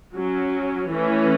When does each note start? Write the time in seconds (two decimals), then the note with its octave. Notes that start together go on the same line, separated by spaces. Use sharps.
0.14 F#3 C#4
0.89 E3 A3 C#4